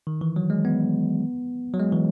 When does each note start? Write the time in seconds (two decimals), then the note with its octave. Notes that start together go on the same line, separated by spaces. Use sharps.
0.07 D#3
0.21 E3
0.36 F#3
0.50 G#3
0.65 B3
1.74 F#3
1.80 G#3
1.93 E3